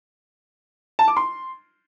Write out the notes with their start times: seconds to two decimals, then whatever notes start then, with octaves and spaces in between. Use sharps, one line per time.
0.99 A5
1.08 D6
1.17 C6